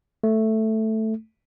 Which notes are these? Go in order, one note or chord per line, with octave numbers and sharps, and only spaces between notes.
A3